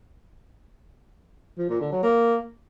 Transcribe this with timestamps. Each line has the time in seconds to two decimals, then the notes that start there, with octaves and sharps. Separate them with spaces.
1.58 F3
1.69 A#2
1.80 D3
1.92 F#3
2.03 A#3